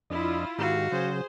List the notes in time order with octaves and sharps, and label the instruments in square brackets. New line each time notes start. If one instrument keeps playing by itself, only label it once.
[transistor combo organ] F2 D4 D#5 [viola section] E4 F4
[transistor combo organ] G#2 D#3 G4 [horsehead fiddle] F#4 F5
[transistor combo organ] C#3 F#3 [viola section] G#4 C5